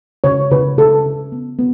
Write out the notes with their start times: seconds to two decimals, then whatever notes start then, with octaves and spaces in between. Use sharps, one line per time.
0.24 C#3 C#5
0.51 C#3 B4
0.78 C#3 A4
1.05 C#3
1.32 B3
1.59 B3